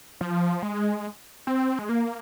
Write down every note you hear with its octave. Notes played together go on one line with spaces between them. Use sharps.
F3
G#3
C4
G#3
A#3